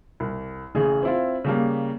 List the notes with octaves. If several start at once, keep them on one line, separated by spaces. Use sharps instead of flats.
C2
A1 C#3 G#4
C4 E4 F4
C#3 G3 A#3